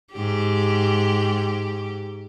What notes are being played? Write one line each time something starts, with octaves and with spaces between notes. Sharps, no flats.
G#2 G4